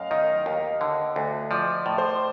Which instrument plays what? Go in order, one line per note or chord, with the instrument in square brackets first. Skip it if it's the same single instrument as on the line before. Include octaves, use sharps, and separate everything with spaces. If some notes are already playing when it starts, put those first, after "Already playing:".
Already playing: [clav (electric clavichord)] F#2 [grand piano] D#5 F5
[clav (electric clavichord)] D#3 [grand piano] D#5
[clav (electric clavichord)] D#2
D3
D2
[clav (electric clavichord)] F3 [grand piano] D5
[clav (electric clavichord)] A2
[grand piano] C5